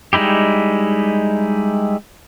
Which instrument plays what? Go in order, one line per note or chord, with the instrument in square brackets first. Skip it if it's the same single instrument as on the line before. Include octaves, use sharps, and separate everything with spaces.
[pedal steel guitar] G3 G#3 D#4 E4 G4